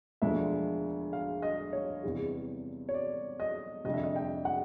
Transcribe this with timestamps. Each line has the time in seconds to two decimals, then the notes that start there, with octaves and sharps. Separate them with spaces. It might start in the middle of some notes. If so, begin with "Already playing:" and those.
0.22 E1 D2 D3 F3 G#3 E5
1.13 F5
1.42 D#5
1.73 C#5
2.03 E2 C3 E3 G3
2.89 C#5
2.94 D5
3.40 D#5
3.85 F1 F2 D3 G3 D#5
3.94 E5
4.03 D#5
4.16 G5
4.45 F#5